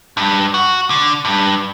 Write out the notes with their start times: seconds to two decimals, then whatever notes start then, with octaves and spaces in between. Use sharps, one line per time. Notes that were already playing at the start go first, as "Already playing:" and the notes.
0.17 G2
0.54 F#4
0.90 D3
1.25 G2